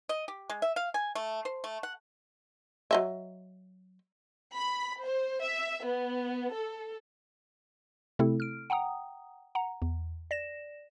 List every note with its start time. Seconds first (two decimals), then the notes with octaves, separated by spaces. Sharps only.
0.09 D#5
0.28 G4
0.50 G#3
0.62 E5
0.76 F5
0.94 G#5
1.15 A3
1.45 C5
1.64 A3
1.83 F#5
2.91 F#3 D#5 E5
4.54 B5
5.02 C5
5.44 E5
5.83 B3
6.53 A4
8.19 C3 A3 C4 E4 A4
8.40 F6 D7
8.70 F#5 G5 A#5 D#6
9.55 F#5 A#5
9.82 E2
10.31 D5 A#6 E7